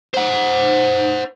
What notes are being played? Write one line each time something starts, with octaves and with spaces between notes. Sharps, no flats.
C5 F#5